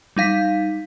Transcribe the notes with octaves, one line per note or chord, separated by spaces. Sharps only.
G3 D#4 F5 B6